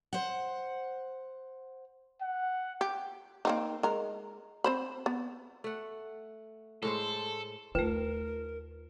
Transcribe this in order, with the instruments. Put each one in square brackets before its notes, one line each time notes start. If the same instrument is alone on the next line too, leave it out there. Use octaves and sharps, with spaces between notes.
[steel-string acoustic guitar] C5 F#5
[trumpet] F#5
[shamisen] G4
A#3 C4 D#4
G#3 A#4
C4 C5 B5
B3
[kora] A3 F#5
[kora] A2 G#3 C5 [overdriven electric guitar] A4
[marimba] D#2 A3 [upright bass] F4 [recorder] A#4 [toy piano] B4